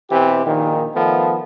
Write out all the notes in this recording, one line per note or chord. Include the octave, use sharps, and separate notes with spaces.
B2 E3 C4 G4
A#1 A#2 D#3
D#3 F3 A3 B3